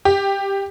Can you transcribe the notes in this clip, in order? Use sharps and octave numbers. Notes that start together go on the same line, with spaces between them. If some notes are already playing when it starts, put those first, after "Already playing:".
G4